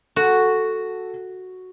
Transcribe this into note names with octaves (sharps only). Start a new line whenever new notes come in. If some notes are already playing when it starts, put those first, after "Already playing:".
F#4 A4